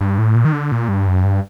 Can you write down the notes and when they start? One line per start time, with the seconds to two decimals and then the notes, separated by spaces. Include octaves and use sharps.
0.01 G2
0.18 A2
0.35 A#2
0.45 D#3
0.53 D3
0.72 A#2
0.88 G2
1.07 F#2
1.24 G2